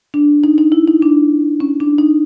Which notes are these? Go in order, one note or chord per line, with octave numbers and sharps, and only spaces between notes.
D4
D#4
D#4
E4
D#4
D4
C#4
D4
D#4